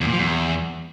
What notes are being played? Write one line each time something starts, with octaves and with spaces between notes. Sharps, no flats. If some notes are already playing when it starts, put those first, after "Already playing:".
E2
A#2
F3
E2